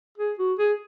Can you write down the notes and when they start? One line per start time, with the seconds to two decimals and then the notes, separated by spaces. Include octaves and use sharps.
0.18 G#4
0.38 F#4
0.58 G#4